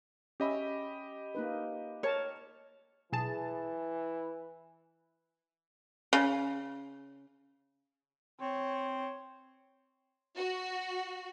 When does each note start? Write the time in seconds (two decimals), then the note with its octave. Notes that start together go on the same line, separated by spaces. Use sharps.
0.40 C#4 G4 D#5 E5 B5
1.35 A#3 D#4 B4
2.03 A#4 C#5 A5
3.13 B1 E3 G#4 A5
6.13 C#3
8.40 C4 C#5
10.36 F#4